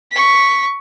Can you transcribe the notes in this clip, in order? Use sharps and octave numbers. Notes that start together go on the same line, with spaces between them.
C#6 B6